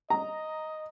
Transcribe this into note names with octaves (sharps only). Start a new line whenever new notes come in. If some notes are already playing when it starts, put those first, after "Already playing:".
D#5 A#5